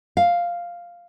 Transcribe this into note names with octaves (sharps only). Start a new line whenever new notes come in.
F5